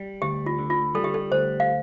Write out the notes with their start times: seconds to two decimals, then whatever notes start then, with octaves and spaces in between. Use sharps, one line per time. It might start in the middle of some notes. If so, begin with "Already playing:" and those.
Already playing: G3
0.22 D2 G4
0.46 F4
0.59 D3
0.70 F4
0.95 G3 A4
1.04 G4
1.14 A4
1.32 D2 C5
1.60 F5